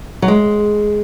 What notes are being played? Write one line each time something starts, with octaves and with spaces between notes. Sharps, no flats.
F#3
G#3